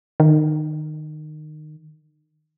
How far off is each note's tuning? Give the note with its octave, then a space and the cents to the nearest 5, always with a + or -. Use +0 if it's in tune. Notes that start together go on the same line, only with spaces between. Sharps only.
D#3 -25